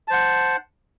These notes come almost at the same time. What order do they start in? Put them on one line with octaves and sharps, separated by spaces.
A5 C5 F#5